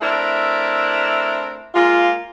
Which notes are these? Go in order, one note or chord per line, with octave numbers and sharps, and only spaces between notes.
A3 C4 D4 E4 A#4
G#3 A#3 F4